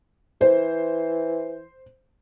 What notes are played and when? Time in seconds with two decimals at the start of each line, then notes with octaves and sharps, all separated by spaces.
0.41 E3 C5